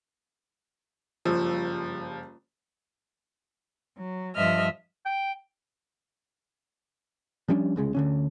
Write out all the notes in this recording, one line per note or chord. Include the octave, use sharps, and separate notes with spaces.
F#1 G2 F3 E6
F#3
G2 F3 D#5 E5 F6
G5
F3 G3 C#4 D4
C2 C#3 G#3
D2 D3 C#4